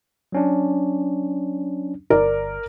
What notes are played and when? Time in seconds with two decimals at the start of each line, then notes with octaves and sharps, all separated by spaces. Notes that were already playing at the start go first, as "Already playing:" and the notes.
0.32 F#3 C#4 D4
2.10 G1 A#4 D5